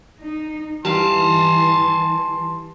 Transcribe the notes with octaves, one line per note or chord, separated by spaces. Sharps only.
D#4
E3 G3 D#4 F5 G#5 A5 C6